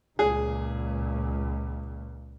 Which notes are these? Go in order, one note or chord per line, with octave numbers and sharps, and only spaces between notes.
C#2 A#2 G#4